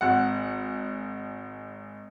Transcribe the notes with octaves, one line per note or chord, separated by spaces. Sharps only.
G#1 F#5